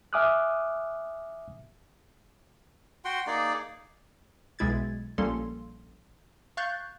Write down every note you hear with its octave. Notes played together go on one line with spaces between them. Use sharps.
E5 G#5 D6 D#6 F6 F#6
F#4 F#5 G5 C6
A#3 D#4 G#4 D5
B1 B2 G#3 E4 G#6 A6
A#1 G3 A#3 C#4 A4 C6
F5 C#6 F#6 G6 A6